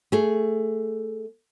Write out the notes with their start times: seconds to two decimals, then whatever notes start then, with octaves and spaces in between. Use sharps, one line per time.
0.12 A3 G#4